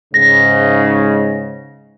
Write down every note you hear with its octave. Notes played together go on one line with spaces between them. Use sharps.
G#2 C#3 A#6